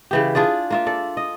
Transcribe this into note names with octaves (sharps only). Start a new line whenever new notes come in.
C#3 E3 G4
D4 F4 G#4 D5
A#3 F4 E5
A4 D5
D#5